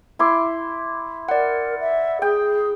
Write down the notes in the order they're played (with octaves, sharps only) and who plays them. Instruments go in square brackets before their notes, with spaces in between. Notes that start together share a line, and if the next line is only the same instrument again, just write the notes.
[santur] E4 C6 D6
[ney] A#4 [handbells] D5 F#5
[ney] E5
[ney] G#4 [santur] G5